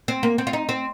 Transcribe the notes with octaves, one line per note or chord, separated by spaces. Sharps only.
C4
A#3
C4
F4
D#4
C4